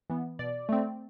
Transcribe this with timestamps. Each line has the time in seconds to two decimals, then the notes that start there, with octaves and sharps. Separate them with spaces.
0.10 E3 B3
0.39 B2 D5
0.69 A3 C4